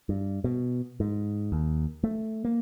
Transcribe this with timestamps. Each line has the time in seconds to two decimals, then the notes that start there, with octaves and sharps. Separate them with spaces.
0.09 G2
0.44 B2
1.00 G#2
1.52 D#2
2.04 A3
2.45 A#3